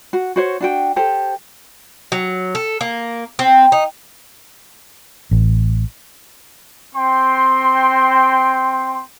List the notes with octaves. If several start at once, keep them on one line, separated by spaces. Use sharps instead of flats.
F#4
F#4 C5 C#5
D4 F#4 G5
G4 A4 C5
F#3
A4
A#3
C4
D#4
A1
C4 G5 C6